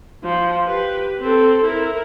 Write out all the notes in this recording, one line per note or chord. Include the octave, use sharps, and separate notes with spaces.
F3
G4 B4
C4 A4
E4 A#4